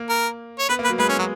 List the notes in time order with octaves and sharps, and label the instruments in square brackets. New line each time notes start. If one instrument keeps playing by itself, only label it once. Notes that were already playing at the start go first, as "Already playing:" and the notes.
Already playing: [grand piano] A#3
[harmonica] A#4
C#5
[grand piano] B3 [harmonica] B4
[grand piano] A#3
[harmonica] B4
[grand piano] F#3
[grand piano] G#3 [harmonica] B4
[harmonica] C#4
F#3